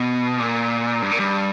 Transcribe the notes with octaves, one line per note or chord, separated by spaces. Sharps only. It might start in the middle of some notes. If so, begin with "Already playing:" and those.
Already playing: B2
A#2
G2
A#2
G2